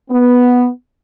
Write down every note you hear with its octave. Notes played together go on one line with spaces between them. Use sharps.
B3